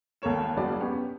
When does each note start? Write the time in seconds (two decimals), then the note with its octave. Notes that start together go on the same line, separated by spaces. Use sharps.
0.22 G#1 D#2 A4 A#4 C#5 E7
0.56 F#1 D#2 C#3 F#3 D5 B5
0.80 B3 C#4 G4